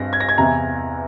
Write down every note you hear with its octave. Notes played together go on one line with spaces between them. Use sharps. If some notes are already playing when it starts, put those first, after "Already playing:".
Already playing: G2 C4 A#6
G#6
A#6
G#6
E2 C3 E3 A#5